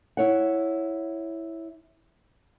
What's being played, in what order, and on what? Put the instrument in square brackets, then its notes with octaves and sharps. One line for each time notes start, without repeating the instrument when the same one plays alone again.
[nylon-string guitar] E4 C#5 F#5